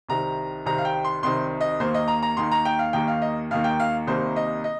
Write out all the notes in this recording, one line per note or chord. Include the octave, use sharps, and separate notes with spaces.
C2 C3 D#3 C4 A#5
C2 C3 D#3 C4 A#5
F5
G5
C6
C2 C3 D#3 C4 C6
D#5
D#2 D#3 A#3 C5
D#5
A#5
A#5
D#2 D#3 A#3 C6
A#5
G5
F5
D#2 D#3 A#3 G5
F5
D#5
D#2 D#3 A#3 F5
G5
F5
C2 C3 D#3 A#3 C5
D#5
D#5